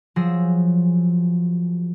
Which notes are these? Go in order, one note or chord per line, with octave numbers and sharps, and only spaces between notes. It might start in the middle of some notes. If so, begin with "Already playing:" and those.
F3 F#3 G#4 E6 A#6